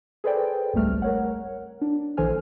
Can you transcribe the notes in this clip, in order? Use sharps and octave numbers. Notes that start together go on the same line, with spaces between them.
G#4 A4 B4 C5 D5 G5
G#1 C#2 G3 A3 F6
A#4 C#5 F#5
D4
A#1 E3 A4 C5 G#5 F6